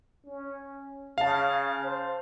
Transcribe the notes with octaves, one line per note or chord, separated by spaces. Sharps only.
C#4
C#3 F5 A5
C5